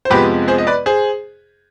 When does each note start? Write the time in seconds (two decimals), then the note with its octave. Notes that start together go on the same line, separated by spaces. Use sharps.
0.05 C5
0.10 F2 C3 F3 G#3 B3 G4 B4
0.48 G#4 C5
0.58 D#5
0.67 B4 D5
0.86 G#4 C5